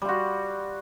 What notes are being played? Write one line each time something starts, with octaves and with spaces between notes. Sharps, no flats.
G3 F4 F#4